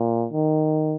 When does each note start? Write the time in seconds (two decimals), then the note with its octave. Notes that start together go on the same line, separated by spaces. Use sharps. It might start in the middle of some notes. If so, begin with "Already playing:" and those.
Already playing: A#2
0.33 D#3